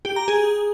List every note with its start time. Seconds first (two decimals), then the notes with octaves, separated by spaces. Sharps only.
0.05 G4
0.16 A#5
0.28 G#4